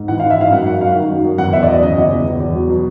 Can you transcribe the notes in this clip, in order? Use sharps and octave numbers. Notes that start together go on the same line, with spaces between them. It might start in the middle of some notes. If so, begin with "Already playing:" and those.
Already playing: G#2
E3 F#5
F5
E3
E5
G#2 F5
F#2 F#5
F#2 F#5
F#3 F5
D#3
F#2
F#2
E2 F#5
E2 E5
D5
F#3 D#5
C#3 D#5
E2
E2
E2
E2
F#3
B2